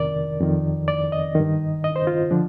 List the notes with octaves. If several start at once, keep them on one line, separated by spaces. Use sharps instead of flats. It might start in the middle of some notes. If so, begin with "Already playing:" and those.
Already playing: F2 C3 D#3 A#4 D5
F2 D#3
D5
D#5
G2 D#3
D#5
C5
F4
D3 F3 D4